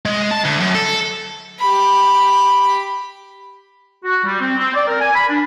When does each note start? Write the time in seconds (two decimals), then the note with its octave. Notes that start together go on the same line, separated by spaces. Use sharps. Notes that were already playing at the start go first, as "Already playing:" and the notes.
0.05 G#3
0.31 A5
0.45 D2
0.60 F#2
0.75 A4
1.59 G4 B5
4.04 F#4
4.24 G3
4.40 C4
4.58 C4
4.74 D5
4.87 A#4
5.00 G#5
5.14 B5
5.30 D4